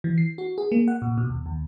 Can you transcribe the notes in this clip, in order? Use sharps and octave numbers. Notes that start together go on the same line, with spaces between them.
E3
C7
F#4
G#4
A#3
F#5
A#2
B2
D#2
D#2